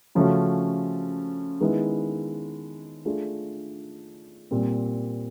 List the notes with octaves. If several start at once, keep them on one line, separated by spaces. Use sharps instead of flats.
C#3 F3 A3 C#4 F#4
D#3 G#3 B3 E4
A3 D4 F4 G#4
A#2 G3 C4